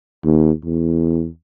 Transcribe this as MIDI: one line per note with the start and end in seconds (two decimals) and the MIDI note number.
0.24 0.51 39
0.64 1.27 40